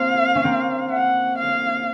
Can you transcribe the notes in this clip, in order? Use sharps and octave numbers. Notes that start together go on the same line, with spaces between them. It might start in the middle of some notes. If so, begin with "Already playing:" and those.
Already playing: A#3 C4 F5
C#4
A#3 C4
F#5
F5